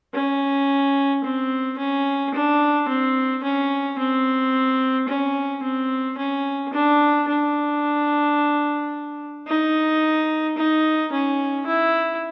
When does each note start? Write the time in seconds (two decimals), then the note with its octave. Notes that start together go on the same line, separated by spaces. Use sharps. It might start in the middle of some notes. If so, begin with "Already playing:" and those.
0.14 C#4
1.24 C4
1.78 C#4
2.34 D4
2.88 C4
3.43 C#4
3.99 C4
5.08 C#4
5.63 C4
6.18 C#4
6.73 D4
7.28 D4
9.48 D#4
10.58 D#4
11.12 C#4
11.67 E4